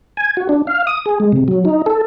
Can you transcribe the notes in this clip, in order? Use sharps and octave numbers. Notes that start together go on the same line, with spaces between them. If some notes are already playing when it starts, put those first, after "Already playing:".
G#5
F#4
D4
F5
D#6
G#4
G#3
C3
F#3
D#4
A4